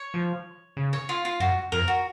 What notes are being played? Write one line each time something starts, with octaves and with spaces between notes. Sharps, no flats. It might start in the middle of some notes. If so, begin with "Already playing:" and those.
Already playing: C#5
F3
C#3
C#5
F4
F4
F#2 F#4
F2 A#4
F#4